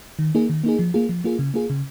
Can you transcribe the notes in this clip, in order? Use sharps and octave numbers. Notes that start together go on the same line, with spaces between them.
D#3
A#3 D#4 G#4
D#3
A#3 D#4 G#4
F3
A#3 F4 G#4
F3
A#3 F4 G#4
C#3
A#3 F4 G#4
C#3